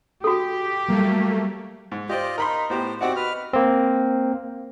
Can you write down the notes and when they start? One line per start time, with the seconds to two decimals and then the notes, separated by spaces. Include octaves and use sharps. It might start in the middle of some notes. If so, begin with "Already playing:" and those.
0.24 F#4 G4 A4
0.88 F#3 G3 A3 A#3
1.92 G#2
2.09 F4 G4 C5 D5 D#5
2.38 D#4 A#4 B5 C6
2.70 A2 B3 G4 C5
3.01 C4 D#4 F#4 G4 D5 F#5
3.16 B4 F6
3.53 A#3 C4